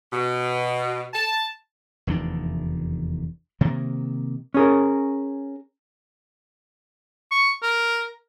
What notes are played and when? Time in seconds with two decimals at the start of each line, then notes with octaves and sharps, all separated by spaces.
0.13 B2
1.14 A5
2.07 F1 E2 D#3 D4
3.61 C3 D#3 A#3
4.54 C#4 G#4 A#4
7.31 C#6
7.63 A#4